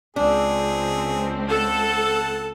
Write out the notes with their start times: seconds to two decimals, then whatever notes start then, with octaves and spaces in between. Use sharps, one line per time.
0.16 C#2 C4 D4 G#4
1.49 A4 F#5 A5